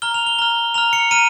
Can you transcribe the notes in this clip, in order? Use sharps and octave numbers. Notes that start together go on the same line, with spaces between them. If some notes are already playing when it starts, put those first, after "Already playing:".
A#5 F6 G7
F7
G7
A#5 F6 G7
A#5 F6 F7
C#7
A#5 F6 D#7